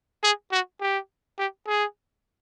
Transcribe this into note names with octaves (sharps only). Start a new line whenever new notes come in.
G#4
F#4
G4
G4
G#4